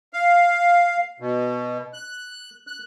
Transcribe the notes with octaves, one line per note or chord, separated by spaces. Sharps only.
F5
B2
F#6
F#6